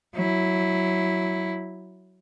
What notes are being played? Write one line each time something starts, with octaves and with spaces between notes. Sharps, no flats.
F#3 E4